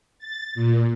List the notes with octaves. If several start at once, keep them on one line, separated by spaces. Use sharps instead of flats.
A6
A#2